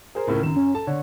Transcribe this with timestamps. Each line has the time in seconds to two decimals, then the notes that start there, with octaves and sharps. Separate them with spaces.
0.15 G#4 A#4 C5
0.27 C#2 A2 C#3
0.43 F#2 D#3 E7
0.56 C#4
0.75 A4 A5
0.87 D3 C#5